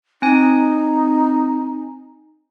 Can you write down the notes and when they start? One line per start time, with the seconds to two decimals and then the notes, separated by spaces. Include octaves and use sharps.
0.22 C4 D#4 G#5